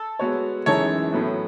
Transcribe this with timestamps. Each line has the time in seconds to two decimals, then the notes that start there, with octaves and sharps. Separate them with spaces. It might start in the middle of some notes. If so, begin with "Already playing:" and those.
Already playing: A4
0.19 G#3 B3 F#4 C#5
0.66 F#2 E3 G#3 D#4 A4 C#5
1.12 A2 F#3 B3 F#4